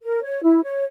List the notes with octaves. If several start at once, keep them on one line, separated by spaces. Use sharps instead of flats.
A#4
C#5
E4
C#5